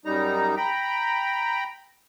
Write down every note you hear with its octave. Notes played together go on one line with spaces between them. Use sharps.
F#2 G3 D#4 A#5
G5 A#5 B5